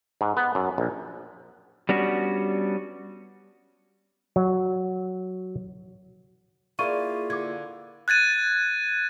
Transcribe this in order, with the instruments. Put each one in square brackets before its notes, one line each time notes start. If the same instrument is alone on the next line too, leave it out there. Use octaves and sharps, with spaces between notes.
[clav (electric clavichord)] G#2
B3
F#2
A#1
[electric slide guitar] G3 B3 C#4 D4 F#4
[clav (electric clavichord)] F#3
[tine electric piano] A#3 E4 F4 [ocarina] G#4 [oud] D5 F5 [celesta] C#6 D#7
[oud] D3 [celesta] D6 G#6
[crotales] F#6 G#6 A6 D#7